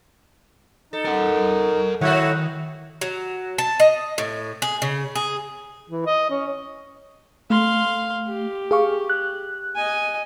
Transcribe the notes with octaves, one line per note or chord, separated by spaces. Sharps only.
D#4 A4
A#4 F#5
D#3 F#3 A3 E4 F#4 C#5 F#5
F#3
A5
D#5
A2
G#4
C#3
G#4
E3
D#5
C#4
A3 F5 C6
G4
G#4 F5 C#6
F#6
D#5 G#5